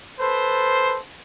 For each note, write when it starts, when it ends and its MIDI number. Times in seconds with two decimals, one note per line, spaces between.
0.19 0.97 69
0.19 0.97 71
0.19 0.97 72